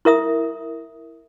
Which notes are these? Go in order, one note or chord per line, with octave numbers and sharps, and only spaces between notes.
E4 A#4 E5 D#6